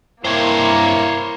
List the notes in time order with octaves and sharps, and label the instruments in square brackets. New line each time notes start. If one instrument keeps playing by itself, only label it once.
[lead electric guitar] G2 C3 [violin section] A#3 [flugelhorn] E4 [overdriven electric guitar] C5 C#5